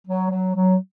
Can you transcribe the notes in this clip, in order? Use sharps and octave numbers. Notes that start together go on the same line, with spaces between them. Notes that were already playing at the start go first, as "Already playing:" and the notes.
F#3
F#3
F#3